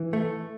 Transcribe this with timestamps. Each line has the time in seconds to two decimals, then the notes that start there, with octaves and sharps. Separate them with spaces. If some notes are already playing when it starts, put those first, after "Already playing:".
Already playing: E3
0.13 A3